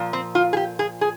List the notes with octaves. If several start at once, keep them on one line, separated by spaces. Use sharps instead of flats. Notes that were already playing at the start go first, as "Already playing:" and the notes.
Already playing: A#2 F3
C4
F4
G#4
G4
G#4
G#4